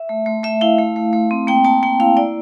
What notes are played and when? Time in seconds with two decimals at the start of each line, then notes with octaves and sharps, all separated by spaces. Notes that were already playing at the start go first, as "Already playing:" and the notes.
Already playing: E5
0.09 A3
0.26 A3
0.43 A3 E5
0.61 E4 F5
0.79 A3
0.96 A3
1.13 A3
1.31 C4
1.47 A#3 G5
1.65 A#3 A5
1.83 A#3 G5
2.00 E4 F5
2.17 E4 D5